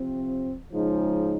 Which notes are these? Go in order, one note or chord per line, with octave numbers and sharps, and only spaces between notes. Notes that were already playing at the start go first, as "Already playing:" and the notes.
Already playing: C3 F3 C4
C#3 F3 G#3 D#4